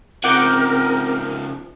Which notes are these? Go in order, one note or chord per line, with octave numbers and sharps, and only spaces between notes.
C#3 F3 C4 A#4 F#5 D6 G6